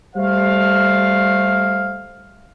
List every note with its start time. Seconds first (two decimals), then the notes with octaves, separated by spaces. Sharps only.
0.16 G3 A3 C5 F5